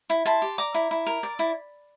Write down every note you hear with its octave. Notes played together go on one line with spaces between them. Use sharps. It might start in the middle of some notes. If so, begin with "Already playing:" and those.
E4
E4 A5 C6
G4
D5 A#5 D6
E4
E4
A#4
D5
E4